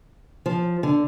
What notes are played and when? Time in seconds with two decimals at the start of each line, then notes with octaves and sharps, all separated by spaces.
0.46 F3
0.83 D3